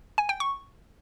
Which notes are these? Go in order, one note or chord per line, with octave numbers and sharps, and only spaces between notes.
G#5
G5
C#6